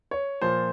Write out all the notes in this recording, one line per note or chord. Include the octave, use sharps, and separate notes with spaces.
C#5
A#2 F3 C5